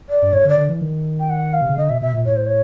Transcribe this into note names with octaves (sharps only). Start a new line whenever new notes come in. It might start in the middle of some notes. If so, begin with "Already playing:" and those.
D5
G2
G#2 C#5
D3
D5
D3
E3
D#3
G5
F#5
F5
C3
C#3
D3 D#5
B2 E5
B2 E5
A#2
A2 C#5
C5
C#5